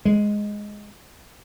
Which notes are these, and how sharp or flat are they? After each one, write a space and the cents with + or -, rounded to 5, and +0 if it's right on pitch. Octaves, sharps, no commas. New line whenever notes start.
G#3 +0